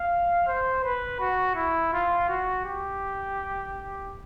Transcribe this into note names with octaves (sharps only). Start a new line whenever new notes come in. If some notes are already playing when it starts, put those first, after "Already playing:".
Already playing: F5
C5
B4
F#4
E4
F4
F#4
G4